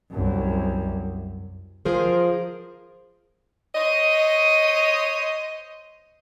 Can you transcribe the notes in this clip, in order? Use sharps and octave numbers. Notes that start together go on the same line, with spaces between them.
C2 F#2
F3 G#4 A#4 C5
C5 C#5 D#5